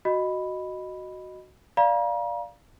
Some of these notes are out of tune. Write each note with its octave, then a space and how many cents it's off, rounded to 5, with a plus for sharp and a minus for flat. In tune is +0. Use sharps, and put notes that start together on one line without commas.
F#4 +0 D#5 -5 B5 +0
D5 +0 F5 +0 A#5 +40